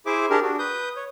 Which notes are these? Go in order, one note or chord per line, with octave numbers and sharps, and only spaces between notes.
E4 G#4 C5 E5 D6
D4 G4 G#4 A#4
D4 F#4
B4 D#6 G6
C#5